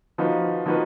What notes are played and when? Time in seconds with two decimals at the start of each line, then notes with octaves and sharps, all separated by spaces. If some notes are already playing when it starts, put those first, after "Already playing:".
0.18 F3 A#3 D#4 F#4 B4
0.66 F3 A#3 D#4 F#4 B4